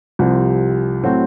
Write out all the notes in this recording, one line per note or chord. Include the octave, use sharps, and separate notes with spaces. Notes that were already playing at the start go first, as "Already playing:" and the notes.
C2 C3 F3 C4
A2 F#3 A3 C4 F#4